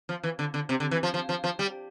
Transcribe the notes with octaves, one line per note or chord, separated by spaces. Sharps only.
F3
E3
D3
D3
C3
D3
E3
F3
F3
F3
F3
G3